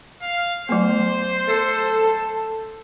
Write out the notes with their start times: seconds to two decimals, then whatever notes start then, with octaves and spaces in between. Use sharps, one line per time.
0.22 F5
0.69 F#3 A3 B3 C5
1.48 A4